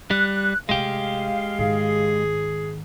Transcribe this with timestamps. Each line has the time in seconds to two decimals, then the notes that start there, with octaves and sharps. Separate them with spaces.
0.11 G3 F#6
0.69 C3 G#3 A3 G4 F5
1.58 G#2 D#3 G#4